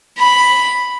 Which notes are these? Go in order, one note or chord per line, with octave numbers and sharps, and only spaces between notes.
B5